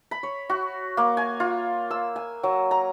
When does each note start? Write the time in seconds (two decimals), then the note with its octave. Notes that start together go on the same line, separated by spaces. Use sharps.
0.11 B5
0.23 C#5
0.50 F#4
0.97 A#3
1.17 G#5
1.40 F4
1.91 E6
2.16 G#5
2.43 F#3
2.71 A#5